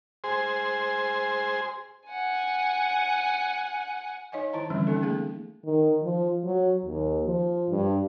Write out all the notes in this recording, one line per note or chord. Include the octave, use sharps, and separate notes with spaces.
G#4 C5
F#5 G#5
D#4 C#5 D#5 F5 G#5
D#3 E4 C5 A5 A#5
D3 E3 F3 G3 C4 C#4
A#3 B3 C#4 D#4 A4
A3 B3 G#4 F5
D#3
F3
F#3
D#2
F3
G2